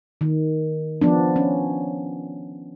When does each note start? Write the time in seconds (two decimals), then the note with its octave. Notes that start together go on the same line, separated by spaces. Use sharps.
0.21 D#3
1.02 F3 B3 D4
1.36 C#4